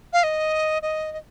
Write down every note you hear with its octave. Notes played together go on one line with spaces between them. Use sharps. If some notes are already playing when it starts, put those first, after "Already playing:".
F5
D#5
D#5
D#5